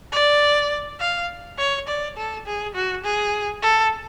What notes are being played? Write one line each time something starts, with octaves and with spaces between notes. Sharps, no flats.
D5
F5
C#5
D5
A4
G#4
F#4
G#4
A4